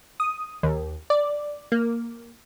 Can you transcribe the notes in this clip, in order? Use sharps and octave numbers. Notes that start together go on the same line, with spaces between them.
D#6
D#2
D5
A#3